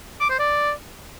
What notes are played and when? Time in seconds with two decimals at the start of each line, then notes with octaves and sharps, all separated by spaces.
0.20 D6
0.30 C5
0.39 D5